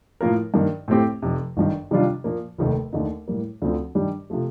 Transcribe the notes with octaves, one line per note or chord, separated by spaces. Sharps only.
A2 F3 A#3 F4 A#4
G2 D#3 A#3
A2 A3 C4 G4
F1 F2 C3
G1 G2 D#3
C3 D#3 G3 D4 F4
A#2 F3 A#3
F1 D#2 D#3 A3
D#2 D3 A3 D#4
A2 G3 A#3
D2 D3 F3 C4
G2 D#3 G3 D4 G4
C3 F3 A3